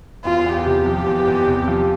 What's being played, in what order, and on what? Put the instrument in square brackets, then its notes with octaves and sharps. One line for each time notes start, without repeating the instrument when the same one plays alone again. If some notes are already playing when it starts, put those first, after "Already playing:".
[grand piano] E2 [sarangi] F4
[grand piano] E2
[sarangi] G4
[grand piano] C3
F3
E2
E2
C3
F3